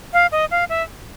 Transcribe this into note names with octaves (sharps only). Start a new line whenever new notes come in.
F5
D#5
F5
E5